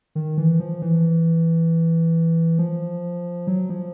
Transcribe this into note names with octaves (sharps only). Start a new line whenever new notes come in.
D#3
E3
F3
E3
F3
F#3
F3